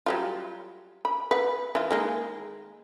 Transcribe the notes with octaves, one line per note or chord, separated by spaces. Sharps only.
F#3 G3 F4
B5
B4 F#5
E3 F4
D#3 G#3 A#3